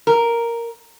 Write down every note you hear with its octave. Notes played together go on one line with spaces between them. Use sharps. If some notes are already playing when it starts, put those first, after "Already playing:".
A#4